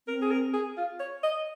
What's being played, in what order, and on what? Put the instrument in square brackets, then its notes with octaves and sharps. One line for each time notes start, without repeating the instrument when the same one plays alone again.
[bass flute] C4 [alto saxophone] A#4
[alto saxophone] G#4
A#4
G#4
F4
C#5
D#5